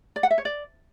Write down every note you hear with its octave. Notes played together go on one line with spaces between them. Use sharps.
D5
F#5
E5
C#5
D5